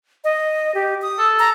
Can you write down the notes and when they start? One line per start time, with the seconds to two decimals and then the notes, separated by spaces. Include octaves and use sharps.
0.24 D#5
0.75 G4
1.02 D#6
1.19 A4
1.39 A#5